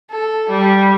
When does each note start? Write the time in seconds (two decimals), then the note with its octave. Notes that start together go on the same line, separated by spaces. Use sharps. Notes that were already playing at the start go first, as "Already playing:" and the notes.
0.12 A4
0.50 G3